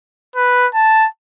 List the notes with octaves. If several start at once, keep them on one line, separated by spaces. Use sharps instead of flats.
B4
A5